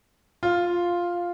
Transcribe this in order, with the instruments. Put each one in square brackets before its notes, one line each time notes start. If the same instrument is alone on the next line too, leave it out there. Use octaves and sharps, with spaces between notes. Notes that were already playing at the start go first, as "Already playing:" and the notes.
[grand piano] F4